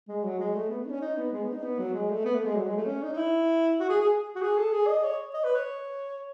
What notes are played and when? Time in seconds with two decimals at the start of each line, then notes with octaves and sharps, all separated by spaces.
0.08 G#3
0.24 F#3
0.39 G#3
0.55 A3
0.70 B3
0.81 B3
0.86 D#4
0.90 C#4
1.01 D#4
1.17 B3
1.33 G#3
1.43 B3
1.53 D#4
1.63 B3
1.79 F#3
1.94 G#3
2.10 A3
2.25 B3
2.35 A3
2.45 G#3
2.56 F#3
2.67 G#3
2.77 A3
2.86 C#4
3.03 D#4
3.13 D#4
3.17 E4
3.80 F#4
3.90 G#4
4.00 G#4
4.35 F#4
4.42 G#4
4.57 A4
4.72 G#4
4.88 D#5
5.04 C#5
5.34 D#5
5.44 B4
5.55 C#5